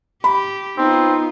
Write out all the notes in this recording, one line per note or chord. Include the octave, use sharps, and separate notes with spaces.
G4 B5
B3 C4 D#4 F4